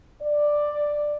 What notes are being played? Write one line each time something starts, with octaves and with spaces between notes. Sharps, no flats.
D5